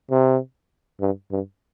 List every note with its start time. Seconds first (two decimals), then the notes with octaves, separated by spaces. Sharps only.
0.11 C3
1.01 G2
1.31 G2